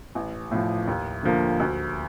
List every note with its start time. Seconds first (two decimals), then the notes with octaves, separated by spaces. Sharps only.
0.15 A1
0.51 A2 F3
0.87 D#2
1.23 D3 F3 A#3
1.60 D2